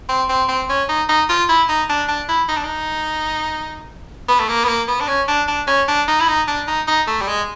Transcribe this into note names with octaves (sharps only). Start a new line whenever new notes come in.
C4
C4
C4
C#4
D#4
D#4
F4
E4
D#4
D4
D4
E4
D#4
D4
D#4
B3
A3
A#3
B3
A#3
B3
D4
C#4
D4
D4
C#4
D4
D#4
E4
D#4
D4
D#4
D#4
A3
G3
G#3